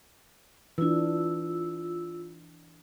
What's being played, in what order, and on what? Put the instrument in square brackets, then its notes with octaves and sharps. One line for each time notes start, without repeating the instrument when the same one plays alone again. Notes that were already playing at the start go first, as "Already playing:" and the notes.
[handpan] E3 D4 [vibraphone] F4 E6